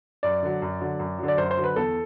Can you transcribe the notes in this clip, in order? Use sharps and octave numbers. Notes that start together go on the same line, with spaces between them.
F#2 D5
D3 F#3
F#2
D3 F#3
F#2
D3 F#3
D5
F#2 C5
C5
D3 F#3
B4
E2 A4